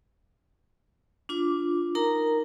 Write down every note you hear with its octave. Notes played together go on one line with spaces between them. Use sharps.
D4 F4 D6
D#4 A#4 A#5